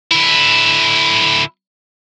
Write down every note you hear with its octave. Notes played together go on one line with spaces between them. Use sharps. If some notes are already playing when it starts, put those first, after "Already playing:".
D3 E4